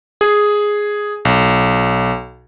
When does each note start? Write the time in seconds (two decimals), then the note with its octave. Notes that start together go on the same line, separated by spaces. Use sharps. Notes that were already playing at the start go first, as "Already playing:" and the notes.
0.21 G#4
1.25 B1